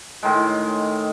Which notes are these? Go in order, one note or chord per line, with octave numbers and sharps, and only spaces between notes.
A2 D#3 G#3